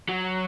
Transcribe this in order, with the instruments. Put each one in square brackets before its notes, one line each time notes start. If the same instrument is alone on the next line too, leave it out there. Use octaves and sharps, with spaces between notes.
[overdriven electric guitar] F#3